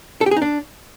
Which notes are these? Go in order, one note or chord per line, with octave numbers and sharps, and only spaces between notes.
A4
G4
G#4
D#4
D4